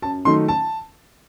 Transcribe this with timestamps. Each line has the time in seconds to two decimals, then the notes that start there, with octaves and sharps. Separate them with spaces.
0.02 F#2 A5
0.25 D#3 F#3 A3 D#4 C6
0.48 A5